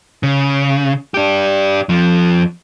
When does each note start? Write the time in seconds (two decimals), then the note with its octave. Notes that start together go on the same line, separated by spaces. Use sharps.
0.23 C#3
1.14 D4 G4
1.89 F2 F3